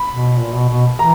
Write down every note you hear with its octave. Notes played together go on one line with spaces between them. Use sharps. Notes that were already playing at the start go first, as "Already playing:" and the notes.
Already playing: B5
B2
A#2
B2
B2
E3 A#5